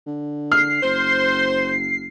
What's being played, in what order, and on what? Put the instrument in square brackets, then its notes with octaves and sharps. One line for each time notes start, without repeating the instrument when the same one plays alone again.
[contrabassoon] D3
[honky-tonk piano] F6 [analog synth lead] C7
[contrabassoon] F#1 [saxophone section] C5